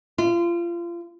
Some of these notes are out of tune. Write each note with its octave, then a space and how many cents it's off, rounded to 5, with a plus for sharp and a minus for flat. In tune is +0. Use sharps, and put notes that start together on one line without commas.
F4 -30